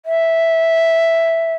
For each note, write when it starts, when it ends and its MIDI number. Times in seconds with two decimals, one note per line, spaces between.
0.06 1.55 76